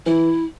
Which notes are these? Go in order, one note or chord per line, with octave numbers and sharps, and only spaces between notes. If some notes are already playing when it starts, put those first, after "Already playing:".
E3 E4